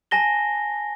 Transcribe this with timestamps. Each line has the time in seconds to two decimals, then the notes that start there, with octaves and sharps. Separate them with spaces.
0.11 G#5 A5 A#6 G7